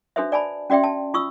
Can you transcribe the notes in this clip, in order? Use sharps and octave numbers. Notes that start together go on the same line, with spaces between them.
D4 F#4 A4 B4 C5 E5
D5 G#5 A5 B5
C#4 F#4 D5 E5 G5 C6
A5
F4 C#6 D#6 E6